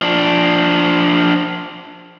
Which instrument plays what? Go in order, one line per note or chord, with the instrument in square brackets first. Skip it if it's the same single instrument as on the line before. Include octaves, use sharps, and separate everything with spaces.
[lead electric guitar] F3 D4